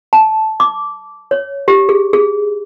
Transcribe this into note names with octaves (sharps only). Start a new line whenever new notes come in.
A5
D6
C#5
G4
G#4
G#4